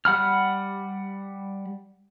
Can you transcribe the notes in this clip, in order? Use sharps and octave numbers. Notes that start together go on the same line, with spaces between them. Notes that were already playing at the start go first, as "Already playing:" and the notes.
G3 F#5 B5 F6